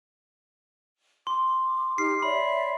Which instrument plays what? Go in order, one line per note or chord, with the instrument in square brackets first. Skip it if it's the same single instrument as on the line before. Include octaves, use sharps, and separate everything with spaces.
[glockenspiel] C6 [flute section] D6
[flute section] D#4 G4 F6 [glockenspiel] C7
[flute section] C#5 D5 E5 [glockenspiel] B5